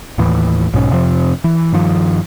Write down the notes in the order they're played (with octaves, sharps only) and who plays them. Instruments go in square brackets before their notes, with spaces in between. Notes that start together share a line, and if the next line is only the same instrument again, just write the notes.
[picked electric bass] D#2 A2 E3
B1 G#2 B2 C#4
F2 C3 F3 C4
E3
G2 D#3 F3